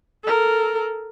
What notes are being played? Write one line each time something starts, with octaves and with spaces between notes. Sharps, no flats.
A4 A#4